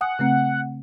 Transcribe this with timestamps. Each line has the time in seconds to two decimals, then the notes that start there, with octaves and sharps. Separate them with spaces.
0.01 F#5 G#5 D#6
0.19 C#3 A3 C4